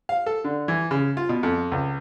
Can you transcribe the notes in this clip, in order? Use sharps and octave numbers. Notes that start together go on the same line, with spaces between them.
F5
A4
D3
E3
C#3
F4
B2
F2
C#2